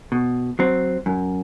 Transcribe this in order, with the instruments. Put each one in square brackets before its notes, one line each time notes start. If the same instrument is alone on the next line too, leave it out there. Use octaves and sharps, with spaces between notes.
[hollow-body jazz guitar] B2
F#3 C4
F#2